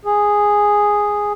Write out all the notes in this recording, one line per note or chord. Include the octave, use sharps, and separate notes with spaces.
G#4